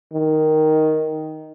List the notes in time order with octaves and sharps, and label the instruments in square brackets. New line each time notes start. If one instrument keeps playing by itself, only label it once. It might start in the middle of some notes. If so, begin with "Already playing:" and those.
[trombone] D#3